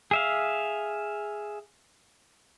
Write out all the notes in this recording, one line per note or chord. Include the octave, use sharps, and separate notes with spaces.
G#4 E5 F5